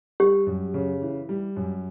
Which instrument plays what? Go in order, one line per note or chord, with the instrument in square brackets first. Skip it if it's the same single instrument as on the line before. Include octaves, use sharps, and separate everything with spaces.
[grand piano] G3 [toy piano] G4
[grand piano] F#2
C#3
E3
G3
F#2